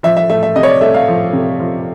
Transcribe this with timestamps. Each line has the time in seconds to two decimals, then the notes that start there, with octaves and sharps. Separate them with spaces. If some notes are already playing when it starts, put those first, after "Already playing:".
0.03 F3 E5
0.17 E5
0.30 A3 E5
0.43 E5
0.56 C3 D#5
0.63 C#5
0.68 D5
0.81 A3 E5
0.94 F5
1.08 F3
1.33 C3
1.60 F3